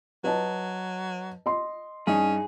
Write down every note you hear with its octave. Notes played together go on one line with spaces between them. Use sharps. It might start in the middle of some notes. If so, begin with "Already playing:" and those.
F#3 B4 D#5 A5
D#5 C6
G2 C#4 D#4 G#4